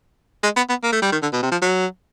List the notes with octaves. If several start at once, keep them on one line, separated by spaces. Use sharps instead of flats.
G#3
B3
B3
A#3
A3
G3
D#3
D3
B2
C3
F3
F#3